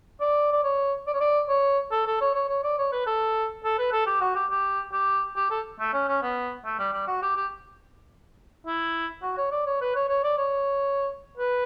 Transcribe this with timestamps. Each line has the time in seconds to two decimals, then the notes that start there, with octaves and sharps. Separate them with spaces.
0.21 D5
0.52 D5
0.63 C#5
1.07 D5
1.14 C#5
1.20 D5
1.49 C#5
1.91 A4
2.06 A4
2.21 C#5
2.35 C#5
2.49 C#5
2.64 D5
2.78 C#5
2.92 B4
3.06 A4
3.64 A4
3.78 B4
3.92 A4
4.06 G4
4.21 F#4
4.35 G4
4.50 G4
4.93 G4
5.36 G4
5.50 A4
5.80 A3
5.93 C#4
6.08 C#4
6.23 B3
6.65 A3
6.79 G3
6.93 G3
7.08 F#4
7.22 G4
7.37 G4
8.66 E4
9.22 F#4
9.37 C#5
9.51 D5
9.66 C#5
9.81 B4
9.95 C#5
10.09 C#5
10.23 D5
10.38 C#5
11.38 B4